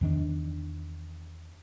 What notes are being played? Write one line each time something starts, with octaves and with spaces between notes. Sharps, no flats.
E2 D#3 D4